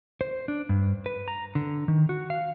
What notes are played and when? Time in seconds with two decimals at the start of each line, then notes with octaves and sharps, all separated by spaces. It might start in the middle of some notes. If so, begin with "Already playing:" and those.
0.21 C5
0.48 D4
0.69 G2
1.06 B4
1.28 A#5
1.55 D3
1.88 D#3
2.09 F#4
2.30 F5